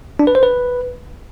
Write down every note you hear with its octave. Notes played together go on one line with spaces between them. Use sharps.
D4
B4
C5
B4